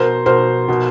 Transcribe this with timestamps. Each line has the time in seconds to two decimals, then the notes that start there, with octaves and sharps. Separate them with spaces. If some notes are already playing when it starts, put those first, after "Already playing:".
Already playing: B2 A#4 C5
0.26 B2 A#4 C5
0.68 B2